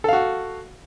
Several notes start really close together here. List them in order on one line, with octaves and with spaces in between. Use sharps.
A4 F5 F#4